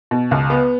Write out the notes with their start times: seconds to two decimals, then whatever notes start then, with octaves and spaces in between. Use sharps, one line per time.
0.11 B2
0.31 C#2
0.50 B3